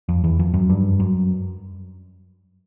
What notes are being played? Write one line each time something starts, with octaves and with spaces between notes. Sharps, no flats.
F2
E2
F2
F#2
G2
F#2